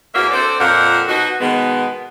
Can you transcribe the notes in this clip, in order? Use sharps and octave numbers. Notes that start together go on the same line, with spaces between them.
E2 A#3 C#4 F#4 E5
C4 D4 A4 C5 D5
F2 A#2 A#4 C5 F#5
B2 D#4 F#4
B2 D#3 G#3 B3